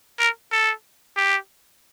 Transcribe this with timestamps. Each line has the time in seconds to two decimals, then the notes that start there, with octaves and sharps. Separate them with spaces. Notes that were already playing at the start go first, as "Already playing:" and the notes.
0.19 A#4
0.52 A4
1.17 G4